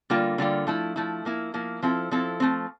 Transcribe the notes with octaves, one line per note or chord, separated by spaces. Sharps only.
D3 G3 A#3 F4
D3 G3 A#3 F4
F3 A3 E4
F3 A3 E4
F3 A#3 E4
F3 A#3 E4
F3 C4 E4 A4
F3 C4 E4 A4
F3 A3 C4